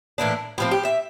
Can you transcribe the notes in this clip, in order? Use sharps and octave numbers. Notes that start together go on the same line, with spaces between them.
A2 E3 A#3 D4
A2 F3 C4 G4
G4
E5